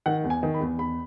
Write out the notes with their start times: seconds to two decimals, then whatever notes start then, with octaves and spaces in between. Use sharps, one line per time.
0.06 D#3 F#5
0.24 E2
0.30 G#5
0.43 D#3
0.54 B5
0.61 E2
0.79 E2 B5